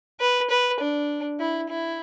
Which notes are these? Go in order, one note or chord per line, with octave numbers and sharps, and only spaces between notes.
B4
B4
D4
E4
E4